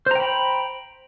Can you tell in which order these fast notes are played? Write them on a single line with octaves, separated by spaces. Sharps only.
C5 A#5 G5 B5